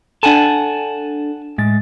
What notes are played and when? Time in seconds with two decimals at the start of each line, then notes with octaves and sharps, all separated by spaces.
0.23 D4 A4 F#5 G#5 A5
1.58 A2 G#3 A6